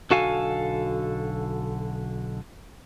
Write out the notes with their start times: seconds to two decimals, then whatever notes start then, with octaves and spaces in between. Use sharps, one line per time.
0.10 B1 D3 F#4 A4 F5 G#5